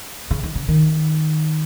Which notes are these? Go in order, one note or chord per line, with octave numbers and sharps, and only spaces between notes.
C#3
D#3
C#3
D#3